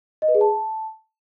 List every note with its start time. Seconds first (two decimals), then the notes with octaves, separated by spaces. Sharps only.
0.22 D#5
0.28 B4
0.35 G#4
0.41 A5